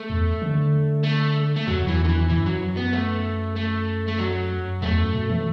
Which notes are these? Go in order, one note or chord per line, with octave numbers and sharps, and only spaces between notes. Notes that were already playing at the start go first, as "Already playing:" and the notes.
Already playing: A3
E2
D3
A3
A3
E2 F#3
E2
E3
D3
E3
F#2 E3
F#3
B3
A3
A3
A3
F#3
E2 A3
F#2
B2
E3